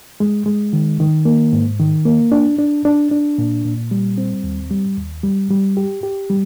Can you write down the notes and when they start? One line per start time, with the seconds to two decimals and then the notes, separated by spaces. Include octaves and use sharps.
0.20 G#3
0.46 G#3
0.73 D#3
1.00 D#3
1.25 A#3
1.53 G#2
1.80 D#3
2.06 A#3
2.32 D4
2.59 D4
2.85 D4
3.11 D4
3.38 A#2
3.65 A#2
3.91 G3
4.18 C4
4.44 D#2
4.71 G3
4.97 D#2
5.23 G3
5.51 G3
5.77 G4
6.03 G4
6.30 G3